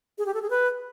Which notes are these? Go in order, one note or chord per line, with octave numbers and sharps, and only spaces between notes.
G#4
G4
A4
G#4
B4